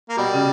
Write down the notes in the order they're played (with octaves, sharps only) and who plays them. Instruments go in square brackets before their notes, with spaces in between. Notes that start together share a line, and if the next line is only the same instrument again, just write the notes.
[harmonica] A#3
[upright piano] B2 [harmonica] G3
[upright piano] C#3